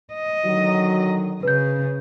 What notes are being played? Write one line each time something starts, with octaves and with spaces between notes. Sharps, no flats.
D#5
D3 D#3 F#3
C#3 B4 G6